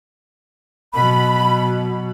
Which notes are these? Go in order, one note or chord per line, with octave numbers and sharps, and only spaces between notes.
B2 F#3 B5